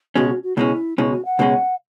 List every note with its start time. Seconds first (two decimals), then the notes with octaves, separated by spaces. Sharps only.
0.15 C#2 B2 G#3 C#4 F#4
0.29 F#4
0.43 F#4
0.57 C#2 B2 G#3 C#4 E4
0.98 C#2 B2 G#3 C#4 E4
1.12 F#4
1.25 F#5
1.39 C#2 B2 G#3 C#4